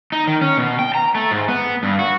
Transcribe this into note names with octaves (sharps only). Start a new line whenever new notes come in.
D#4
D#3
C#4
B2
G5
A#5
A3
G#2
B3
G2
F#4